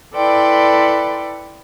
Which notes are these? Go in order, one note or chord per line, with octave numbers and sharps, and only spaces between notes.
E4 A4 B4 D5 G5 C6